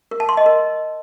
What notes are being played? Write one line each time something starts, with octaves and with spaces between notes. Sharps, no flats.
A#4
A5
C6
D#5
A#4